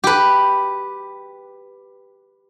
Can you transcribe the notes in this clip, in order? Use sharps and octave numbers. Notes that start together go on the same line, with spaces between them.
G4 B4